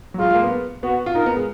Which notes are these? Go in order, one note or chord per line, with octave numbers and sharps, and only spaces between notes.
F#3
G#3 F4
G#3
A#3
B3
B3 F#4
F4
D#4 A#4
B3
G#3